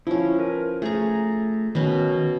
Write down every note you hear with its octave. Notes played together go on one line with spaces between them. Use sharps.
F3 C#4 E4
A#4 B4
A3 G#4 A#5
B2 D#3 C#4